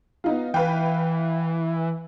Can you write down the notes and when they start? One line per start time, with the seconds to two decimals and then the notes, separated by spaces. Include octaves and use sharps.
0.24 B3 D#4 F4
0.54 E3 B4 F5 G5